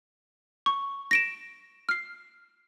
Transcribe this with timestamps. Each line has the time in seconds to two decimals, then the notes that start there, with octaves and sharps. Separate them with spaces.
0.66 C#6
1.11 A#6 D7 E7
1.89 F6 C7